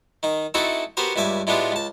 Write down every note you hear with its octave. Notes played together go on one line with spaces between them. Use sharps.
D#3 D#4
A3 C4 D#4 E4 F#4 A4
B3 F#4 G4 A#4 C5
C#2 G2 E5 G#5 D6
A2 G#3 B3 D4 F4 G4
C#2 A5